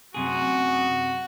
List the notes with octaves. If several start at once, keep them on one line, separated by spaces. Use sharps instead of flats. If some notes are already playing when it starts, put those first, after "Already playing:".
F#2 C3 F#4 G#4